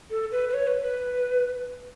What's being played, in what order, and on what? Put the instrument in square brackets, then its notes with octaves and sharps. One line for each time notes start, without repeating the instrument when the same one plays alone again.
[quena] A4
B4
B4
C#5
B4
B4